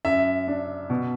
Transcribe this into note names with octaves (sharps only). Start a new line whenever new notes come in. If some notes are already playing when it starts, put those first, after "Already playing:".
F#2 E5
D4
B2